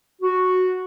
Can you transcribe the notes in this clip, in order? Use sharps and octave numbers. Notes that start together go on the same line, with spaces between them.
F#4